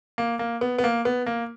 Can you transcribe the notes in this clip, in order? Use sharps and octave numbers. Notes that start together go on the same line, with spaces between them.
A#3
A#3
B3
B3
A#3
B3
A#3